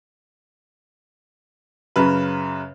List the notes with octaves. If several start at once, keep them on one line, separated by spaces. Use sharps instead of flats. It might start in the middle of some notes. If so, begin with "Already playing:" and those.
F#2 C#3 B4